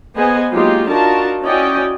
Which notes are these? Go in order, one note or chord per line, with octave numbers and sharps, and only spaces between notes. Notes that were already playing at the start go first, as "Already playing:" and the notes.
B3 G#4 B4 C5 D#5 G#5
F#3 G#3 A#3 D#4 F4 G4
D4 D#4 F4 F#4 A#4 A5
C#4 E4 F#4 D5 D#5 G5